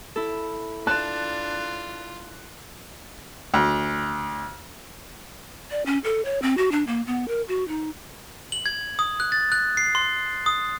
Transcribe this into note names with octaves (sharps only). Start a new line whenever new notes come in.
E4 A4
D4 F4 A5 F#6
D2
D5
C#4
A4
C#5
C4
F#4
D4
A#3
B3
A#4
F#4
D#4
F#7
G#6
D#6
F#6
A6
F#6
C7
C6
D#6